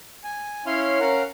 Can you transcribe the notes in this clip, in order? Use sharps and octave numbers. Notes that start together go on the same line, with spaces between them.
G#5
C#4 E4 C#5 F5 C6
C#4 A#4 F5 F#5